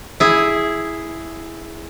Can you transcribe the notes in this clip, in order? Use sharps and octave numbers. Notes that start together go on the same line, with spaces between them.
E4 G#4